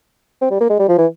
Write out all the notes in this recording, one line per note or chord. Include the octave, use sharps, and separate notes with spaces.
C4
G3
A#3
G#3
G3
F3
E3